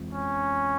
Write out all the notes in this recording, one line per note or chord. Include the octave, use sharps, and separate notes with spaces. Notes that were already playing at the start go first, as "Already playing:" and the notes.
Already playing: F2 E3 G#3 C4 F4
C#4